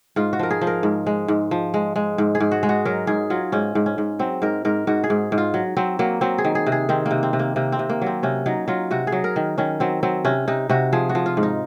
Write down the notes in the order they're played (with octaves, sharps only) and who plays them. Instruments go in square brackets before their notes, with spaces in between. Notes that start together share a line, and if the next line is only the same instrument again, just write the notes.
[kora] G#2 F4
F#4
F3 A#4
G#4
F3
A#4
G#2
G#3
G#2
F3
G#3
G#3
G#2
G#4
G#2
F#4
G#3
F#4
F#3 A#4
G#2 G#4
F#3 F4
G#2 C#4
G#2
C#4
G#2
F#3 C4
G#2 A#4
G#2 A#4
G#2 F#4
G#4
G#2
G#2
F4
F#3
F#3 C4
F#3 A#3
F#3 C4
G#4
D#3
G#4
C3
G#4
D#3 C4
A#3
C3
C4
C3
A#3
C3 A#3
C4
C3
A#3
F#3 C4
C3 C#4
F#3 D#4
F#3 F4
C3 F#4
G#4
F#3
A#4
D#3
D#3 C#4
F#3 C4
F#3 C4
C3 C#4
C3 D#4
C3 F#4
F3 G#4
F#4
F3
F4
G#2
D#4